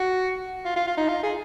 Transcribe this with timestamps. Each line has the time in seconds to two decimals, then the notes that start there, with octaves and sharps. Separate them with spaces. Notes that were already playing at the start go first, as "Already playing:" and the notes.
Already playing: F#4
0.65 F4
0.76 F4
0.87 F4
0.97 D#4
1.08 F4
1.23 G#4